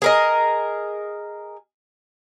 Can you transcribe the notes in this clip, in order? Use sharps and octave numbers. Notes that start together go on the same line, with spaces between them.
G#4 A#4 D#5